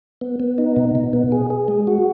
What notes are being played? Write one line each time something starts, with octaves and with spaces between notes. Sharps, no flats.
B3
B3
D#4
B2
B2
B3
G#4
G#4
G#3
F#4